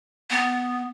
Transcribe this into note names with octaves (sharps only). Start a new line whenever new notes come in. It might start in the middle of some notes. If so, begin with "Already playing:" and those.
B3